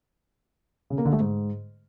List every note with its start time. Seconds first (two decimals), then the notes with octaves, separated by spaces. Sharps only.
0.90 C#3
0.98 A#3
1.05 D3
1.13 A3
1.20 G#2